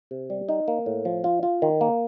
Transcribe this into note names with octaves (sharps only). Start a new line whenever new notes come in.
C3
G3
D#4
A#3
A2
F3
F4
F4
D#3
A#3